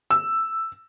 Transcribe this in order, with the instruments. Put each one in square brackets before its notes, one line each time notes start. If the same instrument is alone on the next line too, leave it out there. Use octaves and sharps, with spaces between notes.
[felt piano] E6